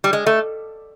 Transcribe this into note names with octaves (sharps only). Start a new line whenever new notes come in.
G3
G#3
A3